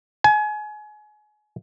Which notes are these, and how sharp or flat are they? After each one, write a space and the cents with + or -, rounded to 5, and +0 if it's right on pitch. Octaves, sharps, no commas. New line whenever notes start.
G#5 +30